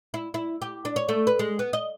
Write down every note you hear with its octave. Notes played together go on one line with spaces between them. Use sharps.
E4
E4
G4
D4
C#5
A3
B4
G#3
B3
D#5